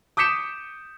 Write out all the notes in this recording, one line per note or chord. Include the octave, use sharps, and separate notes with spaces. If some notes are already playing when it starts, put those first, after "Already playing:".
D6 D#6 G6 B6 C#7 E7